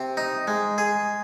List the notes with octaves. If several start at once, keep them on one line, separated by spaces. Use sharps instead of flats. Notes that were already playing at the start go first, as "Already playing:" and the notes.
Already playing: C3 C4
D#4
G#3
G#4